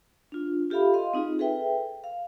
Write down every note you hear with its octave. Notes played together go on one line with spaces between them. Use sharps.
D4 F4
F4 G4 A4 E5 F5 B5
D#5 F5 C6
C4 D#4 F4 G#4
G#4 A4 B4 E5 G5
F5